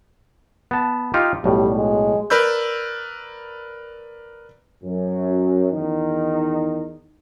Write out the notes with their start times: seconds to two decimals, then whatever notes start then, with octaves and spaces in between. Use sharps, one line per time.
0.71 B3 A5
1.14 D#4 F4 G4
1.44 B1 A2 G3
1.76 G#3
2.30 A#4 B4 D5 B5 E6 G6
4.83 F#2
5.73 E2 D#3 D#4